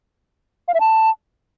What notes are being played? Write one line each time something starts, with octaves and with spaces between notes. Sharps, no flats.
F5
E5
A5